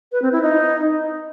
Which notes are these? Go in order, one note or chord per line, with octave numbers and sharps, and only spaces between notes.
B4
C4
E4
D#4